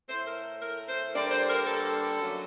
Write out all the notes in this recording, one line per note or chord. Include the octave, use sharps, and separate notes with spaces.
A2 A3 C5
A#4
A#4
C5
G2 D3 G3 A#3 D5
C5
A#4
A4
F#2 F#3 A3